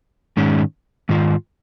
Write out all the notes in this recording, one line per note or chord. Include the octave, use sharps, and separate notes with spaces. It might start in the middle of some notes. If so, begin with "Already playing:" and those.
G#2 D#3 G#3 C#4
G#2 D#3 F4